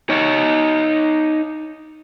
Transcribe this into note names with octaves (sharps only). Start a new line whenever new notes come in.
D#4 C#5